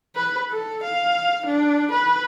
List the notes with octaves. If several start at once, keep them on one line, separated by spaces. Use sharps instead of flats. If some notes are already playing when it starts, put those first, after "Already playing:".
B4
A4
F5
D4
B4